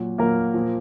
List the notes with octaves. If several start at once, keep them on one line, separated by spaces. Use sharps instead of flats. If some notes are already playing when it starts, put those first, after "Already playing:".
Already playing: A#2 F#3
A#2 F#3 A#3 A#4
A#2 F3